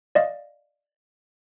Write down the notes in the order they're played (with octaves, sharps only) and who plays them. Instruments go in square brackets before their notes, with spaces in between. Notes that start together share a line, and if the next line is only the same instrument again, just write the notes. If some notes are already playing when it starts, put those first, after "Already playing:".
[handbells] D5 D#5 F5